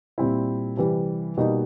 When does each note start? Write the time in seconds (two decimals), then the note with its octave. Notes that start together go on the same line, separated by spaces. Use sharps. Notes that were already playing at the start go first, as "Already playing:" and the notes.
0.18 A#2 G3 C4 E4
0.77 C3 E3 G3
1.37 B2 G3 A#3 D#4